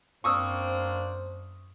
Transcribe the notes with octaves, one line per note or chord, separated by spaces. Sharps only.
F#2 A#3 C4 D4 C5 C#6 D#6 E6